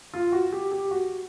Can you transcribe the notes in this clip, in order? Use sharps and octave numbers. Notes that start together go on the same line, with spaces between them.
F4
F#4
G4
G4
F#4